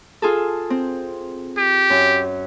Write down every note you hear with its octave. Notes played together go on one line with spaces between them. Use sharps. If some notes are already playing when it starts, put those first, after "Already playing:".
F4 G#4 A4
C4
G4
F#2